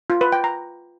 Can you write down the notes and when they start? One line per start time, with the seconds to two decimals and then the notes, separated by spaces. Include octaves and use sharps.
0.10 F4
0.21 B4
0.32 G5
0.44 A#5